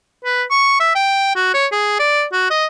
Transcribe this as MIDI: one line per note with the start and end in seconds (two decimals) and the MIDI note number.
0.24 0.43 71
0.50 0.79 85
0.80 0.92 76
0.95 1.33 79
1.36 1.50 66
1.54 1.66 73
1.72 1.99 68
1.99 2.24 74
2.33 2.47 66
2.50 2.66 75